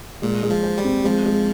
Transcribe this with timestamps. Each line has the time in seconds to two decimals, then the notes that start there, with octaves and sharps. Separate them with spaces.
0.22 A#2 G#3
0.43 G#3
0.50 F3
0.63 C5
0.78 G3
0.84 C4
1.04 F3 G#3
1.26 G#3